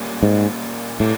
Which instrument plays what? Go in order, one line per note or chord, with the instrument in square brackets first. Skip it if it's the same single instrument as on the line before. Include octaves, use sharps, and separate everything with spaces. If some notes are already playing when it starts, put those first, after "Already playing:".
Already playing: [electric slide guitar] A#2 G3 A#3 C#4
[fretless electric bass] G#2
[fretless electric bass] A2 [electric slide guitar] C3 E3 G3 A#3 D4